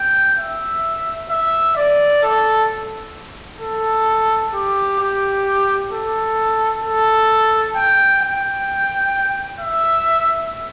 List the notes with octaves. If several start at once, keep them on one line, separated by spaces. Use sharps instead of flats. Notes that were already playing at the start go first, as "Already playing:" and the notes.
Already playing: G5
E5
E5
D5
A4
A4
G4
G4
A4
A4
G5
G5
E5